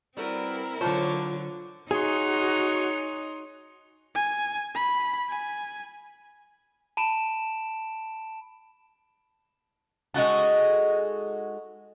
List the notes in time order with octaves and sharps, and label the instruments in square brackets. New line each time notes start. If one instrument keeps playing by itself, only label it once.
[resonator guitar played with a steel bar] G3 F#4 B4 [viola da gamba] C4 [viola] E4 A#4
[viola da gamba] D3 F#3 [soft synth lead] F4 [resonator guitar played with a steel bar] C5 C#5 A5
[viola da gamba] D#4 [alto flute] F#4 [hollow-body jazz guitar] G#4 [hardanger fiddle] C#5 C6
[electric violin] G#5
B5
G#5
[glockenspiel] A5 B5 D7 E7
[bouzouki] G#3 D#4 F#4 A4